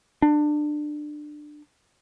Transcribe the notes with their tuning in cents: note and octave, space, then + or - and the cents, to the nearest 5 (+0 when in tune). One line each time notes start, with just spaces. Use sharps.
D4 +25